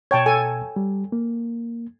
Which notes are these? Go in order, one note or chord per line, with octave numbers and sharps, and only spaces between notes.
B2 C#5 G5 A5 G#6
A4 G#5
G3
A#3